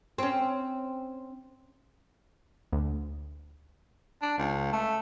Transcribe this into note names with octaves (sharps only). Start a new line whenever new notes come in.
C4 C#4
D2
D4
C#2
A3